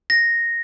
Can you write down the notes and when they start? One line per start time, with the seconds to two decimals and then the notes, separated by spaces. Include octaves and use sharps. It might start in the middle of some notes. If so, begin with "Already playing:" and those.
0.10 A#6